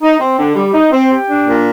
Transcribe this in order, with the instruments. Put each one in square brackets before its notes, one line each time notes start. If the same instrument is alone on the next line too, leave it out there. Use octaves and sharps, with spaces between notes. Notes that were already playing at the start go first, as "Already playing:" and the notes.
[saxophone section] D#4
C4
D3
G3
D#4
C4
G4
D4
A#2